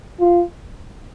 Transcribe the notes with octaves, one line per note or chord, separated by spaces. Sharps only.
F4